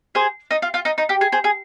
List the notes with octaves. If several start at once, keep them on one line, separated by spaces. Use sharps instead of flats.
G#4 C5
D#4
F4
F4
D#4
D#4
G4
G#4
G#4 C5
G#4